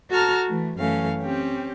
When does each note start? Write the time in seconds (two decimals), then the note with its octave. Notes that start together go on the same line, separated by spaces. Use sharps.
0.10 F#4 A4 A5 A#5 F6
0.47 E3 A3
0.77 F#2 E3 A3 C#4 F5
1.20 C4 C#4 G4 C#5